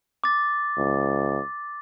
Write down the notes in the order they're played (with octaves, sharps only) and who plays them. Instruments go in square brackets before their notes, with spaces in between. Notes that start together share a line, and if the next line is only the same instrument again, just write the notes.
[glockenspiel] D6 A6
[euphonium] C#2